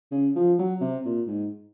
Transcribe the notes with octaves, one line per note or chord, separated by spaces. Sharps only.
C#3
F3
F#3
C3
A#2
G#2